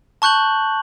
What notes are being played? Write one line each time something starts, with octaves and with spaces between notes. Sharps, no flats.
A5 C#6 F#6 G6 F#7